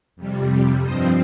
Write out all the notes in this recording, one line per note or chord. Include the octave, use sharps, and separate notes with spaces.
F2 C3 G3
G2 F3 C4 C5 D#5